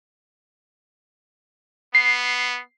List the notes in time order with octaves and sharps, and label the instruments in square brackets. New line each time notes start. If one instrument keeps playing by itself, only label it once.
[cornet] B3 [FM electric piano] C7